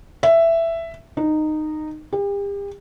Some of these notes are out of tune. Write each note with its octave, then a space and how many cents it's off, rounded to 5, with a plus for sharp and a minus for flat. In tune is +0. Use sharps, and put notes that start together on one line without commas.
E5 +10
D#4 -15
G4 +40